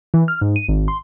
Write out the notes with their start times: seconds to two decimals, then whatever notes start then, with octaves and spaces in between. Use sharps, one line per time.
0.14 E3
0.28 F6
0.41 G#2
0.56 D#7
0.69 G#1
0.88 C6